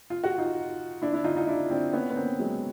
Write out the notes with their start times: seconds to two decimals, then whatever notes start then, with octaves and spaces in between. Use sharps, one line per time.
0.10 F4
0.24 F#4
0.38 D#4 F4
1.02 D4 E4
1.13 D4 E4
1.24 D#4 F4
1.36 D#4 F4
1.47 D4 E4
1.70 C4 D4
1.93 B3 C#4
2.10 B3
2.16 A#3 C4
2.39 F#3 G#3